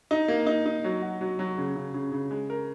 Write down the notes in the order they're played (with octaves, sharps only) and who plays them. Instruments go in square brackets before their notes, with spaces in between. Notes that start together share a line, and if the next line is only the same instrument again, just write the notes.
[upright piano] D#4
A#3
D#4
D#4
F#3
F#4
F#3
F#3
C#3
C#3
C#3
C#3
G#3
A#4